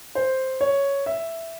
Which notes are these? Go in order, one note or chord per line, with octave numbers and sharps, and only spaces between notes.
C5
C#5
E5